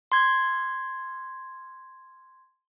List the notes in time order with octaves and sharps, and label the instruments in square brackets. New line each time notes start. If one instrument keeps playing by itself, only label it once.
[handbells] C6 G#6